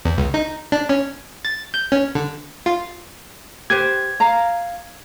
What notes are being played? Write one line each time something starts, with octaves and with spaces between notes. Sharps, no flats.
E2
C#2
D#4
D4
C#4
A6
G6
C#4
D3
F4
G4 B4 C5 G#6
F5 A#5